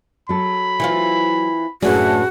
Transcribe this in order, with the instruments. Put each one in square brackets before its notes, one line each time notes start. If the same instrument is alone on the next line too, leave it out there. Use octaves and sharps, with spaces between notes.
[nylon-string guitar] F#3 A4 [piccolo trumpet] B5
[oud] E3 C4 F4
[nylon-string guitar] F#2 A3 G#4 [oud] A2 E3 D4 [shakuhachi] F#4